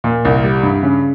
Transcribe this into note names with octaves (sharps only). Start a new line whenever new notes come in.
A#2
C2
G3
G2
C#3